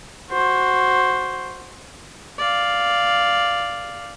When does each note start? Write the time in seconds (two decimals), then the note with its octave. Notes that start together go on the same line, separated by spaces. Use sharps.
0.31 F#4 C5
2.38 D5 F5